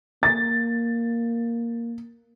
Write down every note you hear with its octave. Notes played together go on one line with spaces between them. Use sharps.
A#3 A6